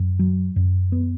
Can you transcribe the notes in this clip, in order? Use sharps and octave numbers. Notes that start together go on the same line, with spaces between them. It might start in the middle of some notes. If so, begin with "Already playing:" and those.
Already playing: F#2
F#3
F#2
B3